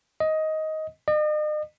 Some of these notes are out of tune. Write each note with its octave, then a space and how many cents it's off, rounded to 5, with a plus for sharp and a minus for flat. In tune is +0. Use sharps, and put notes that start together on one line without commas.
D#5 +15
D#5 -40